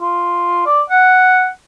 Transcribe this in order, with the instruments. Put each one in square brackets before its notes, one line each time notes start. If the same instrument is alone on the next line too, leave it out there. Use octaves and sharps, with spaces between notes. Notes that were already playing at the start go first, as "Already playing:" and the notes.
[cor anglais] F4
D5
F#5